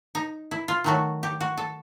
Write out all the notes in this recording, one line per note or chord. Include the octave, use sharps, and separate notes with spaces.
D#4
E4
F4
D#3 F#3 A3 F#4
G4
F#4
A4